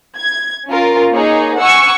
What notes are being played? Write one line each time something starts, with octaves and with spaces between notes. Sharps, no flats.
G#6
C#4 F4 A#4
A#3 D#4 G#4 C#5
F#5 G#5 C#6 E6